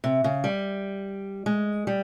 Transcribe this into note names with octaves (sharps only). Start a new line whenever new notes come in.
C3
C#3
G3
G#3
G3